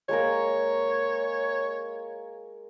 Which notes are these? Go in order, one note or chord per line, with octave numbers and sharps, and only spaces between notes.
G#3 A#3 A#4 C#5